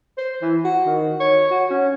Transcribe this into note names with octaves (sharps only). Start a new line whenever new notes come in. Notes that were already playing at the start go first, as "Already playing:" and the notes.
C5
E3
F#4
D#3
C#5
F#4
C#4